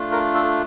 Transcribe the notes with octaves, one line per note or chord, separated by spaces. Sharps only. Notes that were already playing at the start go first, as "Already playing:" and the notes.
Already playing: A3 D4 F4
A#4
A4